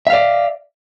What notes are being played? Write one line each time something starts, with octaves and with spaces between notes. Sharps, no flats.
D5 E5 F5